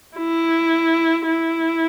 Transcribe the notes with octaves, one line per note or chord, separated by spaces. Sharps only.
E4
E4